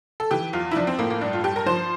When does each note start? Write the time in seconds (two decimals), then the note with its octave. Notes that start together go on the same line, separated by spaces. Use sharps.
0.20 A4
0.31 E3 G4
0.53 E2 F4
0.71 E4
0.76 F3 D4
0.87 C4
0.99 A2 A#3
1.10 A#3
1.21 G2 D4
1.33 F4
1.44 G2 G4
1.56 A#4
1.66 F3 C5